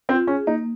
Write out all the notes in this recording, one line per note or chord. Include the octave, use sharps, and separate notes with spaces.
C4 F4
C#4 G#4
A#3 D#4